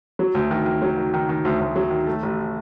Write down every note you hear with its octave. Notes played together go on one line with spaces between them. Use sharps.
F#3
D2
D#3
D#3
F#3
D#3
D#3
D#3
D2
D2
F#3
D#3
A3
A1